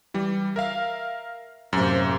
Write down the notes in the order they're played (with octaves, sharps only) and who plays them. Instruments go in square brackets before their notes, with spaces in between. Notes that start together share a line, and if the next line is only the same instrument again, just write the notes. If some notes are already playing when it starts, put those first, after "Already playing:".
[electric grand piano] E3 G3
A#4 E5 F5
[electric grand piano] F#2 [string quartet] A2 C3 A#3